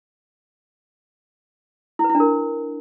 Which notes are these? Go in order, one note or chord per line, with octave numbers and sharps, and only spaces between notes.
E4
B4
E4
D4
A#4